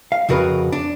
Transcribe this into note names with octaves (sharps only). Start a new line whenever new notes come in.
F5
F2 C#3 F#4 A#4 B4
D4